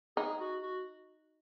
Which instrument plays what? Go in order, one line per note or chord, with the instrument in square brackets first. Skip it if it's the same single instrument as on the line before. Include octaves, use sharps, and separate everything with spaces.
[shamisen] D#4 [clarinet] G#4
[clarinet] F#4
F#4